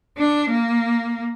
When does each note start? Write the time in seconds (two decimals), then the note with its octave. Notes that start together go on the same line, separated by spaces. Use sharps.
0.17 D4
0.50 A#3